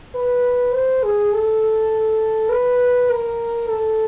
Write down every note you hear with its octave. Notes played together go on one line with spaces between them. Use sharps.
B4
C5
G#4
A4
B4
A#4
A4